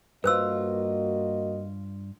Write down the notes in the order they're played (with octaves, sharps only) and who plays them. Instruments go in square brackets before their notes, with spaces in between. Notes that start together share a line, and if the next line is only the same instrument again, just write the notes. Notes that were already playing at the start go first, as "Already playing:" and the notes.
[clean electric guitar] G2 F4 [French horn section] A#3 F#4 D#5 [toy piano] B4 C5 E6